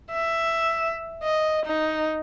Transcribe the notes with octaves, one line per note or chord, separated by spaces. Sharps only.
E5
D#5
D#4